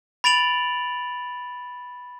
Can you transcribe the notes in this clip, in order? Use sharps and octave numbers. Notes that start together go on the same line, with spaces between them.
B5 A6 D7 F7 F#7